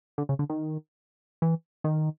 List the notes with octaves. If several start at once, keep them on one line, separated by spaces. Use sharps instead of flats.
D3
C#3
D3
D#3
E3
D#3